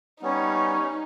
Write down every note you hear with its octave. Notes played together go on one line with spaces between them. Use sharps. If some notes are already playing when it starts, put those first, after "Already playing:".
G3 B3 C#4 D#4